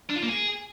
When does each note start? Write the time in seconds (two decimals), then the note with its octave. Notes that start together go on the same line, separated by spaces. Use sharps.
0.10 D4
0.16 F4
0.23 A#3
0.29 G#4